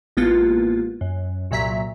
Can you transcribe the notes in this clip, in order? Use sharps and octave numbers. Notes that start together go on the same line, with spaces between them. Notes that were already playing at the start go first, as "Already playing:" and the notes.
A1 G#3 A#3 B3 F4 A6
F#2
C2 A#2 F#3 E5 A#5 B6